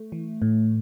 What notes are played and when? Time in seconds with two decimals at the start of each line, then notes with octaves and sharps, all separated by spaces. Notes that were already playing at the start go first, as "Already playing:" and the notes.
Already playing: A3
0.12 E3
0.42 A2